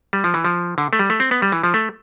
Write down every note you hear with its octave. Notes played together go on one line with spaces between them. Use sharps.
G3
F3
E3
F3
D3
A3
G3
A3
C4
B3
G3
E3
F3
A3